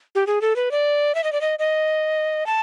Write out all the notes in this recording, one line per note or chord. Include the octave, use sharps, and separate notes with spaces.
G4
G#4
A4
B4
D5
E5
D#5
D5
D#5
D#5
A5